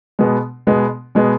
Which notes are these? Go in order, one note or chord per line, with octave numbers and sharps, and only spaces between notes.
B2 G#3 B3
B2 G#3 B3
B2 G#3 B3